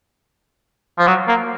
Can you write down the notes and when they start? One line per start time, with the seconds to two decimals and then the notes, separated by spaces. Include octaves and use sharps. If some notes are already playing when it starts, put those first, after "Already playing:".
0.98 F3
1.07 F#3
1.28 A#3